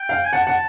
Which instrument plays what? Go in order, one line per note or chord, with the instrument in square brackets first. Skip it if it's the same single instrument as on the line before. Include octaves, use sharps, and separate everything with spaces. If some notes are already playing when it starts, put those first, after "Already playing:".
Already playing: [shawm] G5
[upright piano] F5
[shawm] G#5
[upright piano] F#5 [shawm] A5
[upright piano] F#5